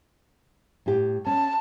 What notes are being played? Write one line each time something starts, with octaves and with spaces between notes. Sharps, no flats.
A2 G4
C#4 A5